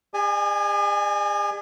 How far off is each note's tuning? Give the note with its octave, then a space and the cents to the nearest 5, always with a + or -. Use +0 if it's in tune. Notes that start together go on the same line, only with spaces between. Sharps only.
G#4 -45 D5 +45 G#5 +0